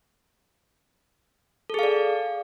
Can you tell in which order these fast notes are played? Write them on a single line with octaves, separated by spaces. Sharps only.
A4 G#4 F5 D5